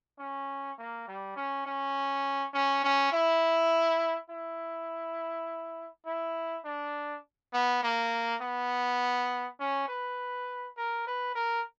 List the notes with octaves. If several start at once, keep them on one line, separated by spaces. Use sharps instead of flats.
C#4
A#3
G3
C#4
C#4
C#4
C#4
E4
E4
E4
D4
B3
A#3
B3
C#4
B4
A#4
B4
A#4